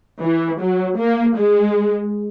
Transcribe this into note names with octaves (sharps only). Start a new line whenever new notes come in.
E3
F#3
A#3
G#3